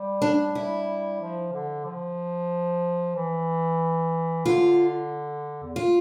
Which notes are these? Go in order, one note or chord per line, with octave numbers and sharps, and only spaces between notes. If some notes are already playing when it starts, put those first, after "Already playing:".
Already playing: G3
D4
E4
F3
D3
F3
E3
D3 F4
E2
F4